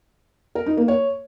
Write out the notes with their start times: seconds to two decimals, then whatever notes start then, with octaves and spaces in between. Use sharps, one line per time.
0.55 A#4
0.66 D#4
0.77 A#3
0.88 C#5